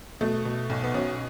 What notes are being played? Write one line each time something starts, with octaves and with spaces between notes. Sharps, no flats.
B2 A3
B2
B1
B3
B2 C#4